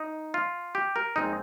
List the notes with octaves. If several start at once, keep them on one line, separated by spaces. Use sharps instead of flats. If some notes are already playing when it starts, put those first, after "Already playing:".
Already playing: D#4
F4
G4
A#4
A#1 A#2 G#3 C4 D#4